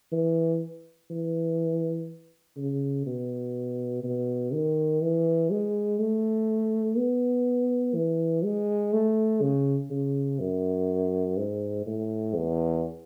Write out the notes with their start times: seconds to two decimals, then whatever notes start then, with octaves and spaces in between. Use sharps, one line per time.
0.12 E3
1.11 E3
2.57 C#3
3.06 B2
4.04 B2
4.53 D#3
5.02 E3
5.51 G#3
5.99 A3
6.97 B3
7.95 E3
8.44 G#3
8.93 A3
9.42 C#3
9.91 C#3
10.40 F#2
11.37 G#2
11.86 A2
12.36 E2